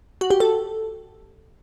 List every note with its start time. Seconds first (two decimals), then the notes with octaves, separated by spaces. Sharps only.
0.21 F#4
0.30 G4
0.40 A4